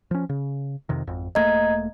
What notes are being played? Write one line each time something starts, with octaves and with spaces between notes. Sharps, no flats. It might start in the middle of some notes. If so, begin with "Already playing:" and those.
F3 C#4
C#3
F2 C3 D#3
G#1 F2
E1 A3 A#3 D#5 A#5 G#6